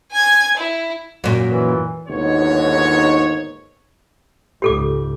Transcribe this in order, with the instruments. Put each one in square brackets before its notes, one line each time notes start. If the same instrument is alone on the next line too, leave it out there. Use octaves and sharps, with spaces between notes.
[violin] G#5 G#6
E4
[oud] F#2 A#2
[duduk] E3
[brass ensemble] G1 D#2 G#2 B2 C#5
[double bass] C#2 G#2 [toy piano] G4 A4 D6